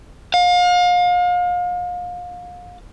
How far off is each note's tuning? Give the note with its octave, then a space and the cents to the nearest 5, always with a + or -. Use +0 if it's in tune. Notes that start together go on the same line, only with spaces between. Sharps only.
F5 +35